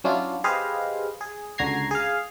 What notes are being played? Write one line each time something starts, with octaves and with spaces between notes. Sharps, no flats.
F#3 C#4 D4 E4 F4
G4 G#4 B4 C5 D#5 F5
G#4
C#2 D3 F#4 A#5 G#6 C7
G#4 F5